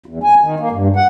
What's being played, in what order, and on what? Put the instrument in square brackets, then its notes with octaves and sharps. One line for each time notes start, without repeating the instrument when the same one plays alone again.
[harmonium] E2
G#5
D#3
A#3
G2
F#5